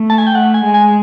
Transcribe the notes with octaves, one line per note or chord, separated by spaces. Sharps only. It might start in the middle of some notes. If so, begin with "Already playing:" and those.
Already playing: A3
A5
G#5
G5
A3 F#5
G#5
G#3
G#5